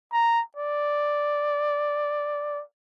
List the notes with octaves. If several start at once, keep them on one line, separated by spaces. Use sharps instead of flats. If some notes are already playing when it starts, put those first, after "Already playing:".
A#5
D5